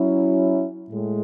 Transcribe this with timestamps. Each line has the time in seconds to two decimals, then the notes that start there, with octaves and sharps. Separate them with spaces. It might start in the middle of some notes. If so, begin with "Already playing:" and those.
Already playing: F#3 C#4 E4
0.90 A2 G#3